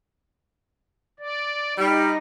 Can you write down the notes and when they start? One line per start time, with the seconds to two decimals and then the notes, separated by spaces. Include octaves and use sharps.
1.19 D5
1.78 G3 D#4